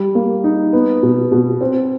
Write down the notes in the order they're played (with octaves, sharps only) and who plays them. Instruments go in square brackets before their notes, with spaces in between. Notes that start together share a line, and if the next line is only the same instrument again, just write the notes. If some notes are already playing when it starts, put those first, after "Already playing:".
Already playing: [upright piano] G3
A#3
D#4
B3
B2
B2
C4